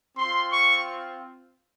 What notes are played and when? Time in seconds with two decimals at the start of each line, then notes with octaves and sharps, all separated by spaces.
0.17 C4 F4 C6
0.51 C#6